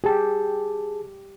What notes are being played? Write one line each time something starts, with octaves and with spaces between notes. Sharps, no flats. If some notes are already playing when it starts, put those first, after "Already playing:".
G4 G#4 A5